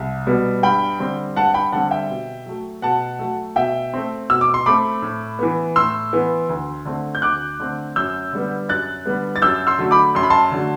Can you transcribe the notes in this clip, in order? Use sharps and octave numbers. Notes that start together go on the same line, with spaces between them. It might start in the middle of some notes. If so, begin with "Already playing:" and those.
Already playing: C2
B2 G3 B3
G2 G5 B5
D3 G3 C4
G2 F#5 A5
G5 B5
D3 G3 C4 F#5 A5
E5 G5
B2
F#3 A3
B2 F#5 A5
F#3 A3
B2 E5 G5
A3 C4
B2 E6
D6
C6
A3 C4 B5 D6
A2
E3 B3
A2 C6 E6
E3 B3
D2
D3 A3 C4
G6
D2 D6 F#6
D3 A3 C4
F#2 E6 G6
D3 G3 B3
F#2 F#6 A6
D3 G3 B3
A6
F#2 E6 G6
C6 E6
D3 F#3 A3
B5 D6
F#2 C6
B5
A5 C6
D3 F#3 A3